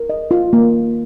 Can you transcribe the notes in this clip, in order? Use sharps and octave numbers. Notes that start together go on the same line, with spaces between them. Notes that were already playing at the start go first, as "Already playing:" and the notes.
Already playing: A#4
D#5
F4
A#3